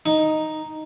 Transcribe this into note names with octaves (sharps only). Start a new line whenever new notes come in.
D#4